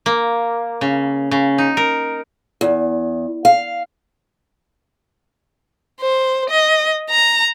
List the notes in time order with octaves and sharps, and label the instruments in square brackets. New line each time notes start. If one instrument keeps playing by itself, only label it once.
[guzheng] A#3
C#3
C#3
D#4
A#4
[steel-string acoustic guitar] E2
F5
[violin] C5
D#5
A#5